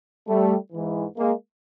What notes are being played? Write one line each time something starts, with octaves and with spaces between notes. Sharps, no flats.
G3 A3
G#2 E3
G#3 A#3